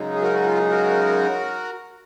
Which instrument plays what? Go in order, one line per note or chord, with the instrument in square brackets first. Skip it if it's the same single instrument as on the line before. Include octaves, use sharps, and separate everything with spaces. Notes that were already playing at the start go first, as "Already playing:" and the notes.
Already playing: [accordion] F#2 C#3 G#3 D#4
G#4
F#4 A#4
F#4
F4
F#4 A#4